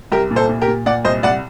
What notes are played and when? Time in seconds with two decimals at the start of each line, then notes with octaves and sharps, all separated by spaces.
0.12 C2 G4 A#4
0.31 A#2
0.36 A4 C5
0.49 A#2
0.61 G4 A#4
0.68 A#2
0.86 A#2 D5 F#5
1.05 C2 C5 D#5
1.23 C2 D5 F#5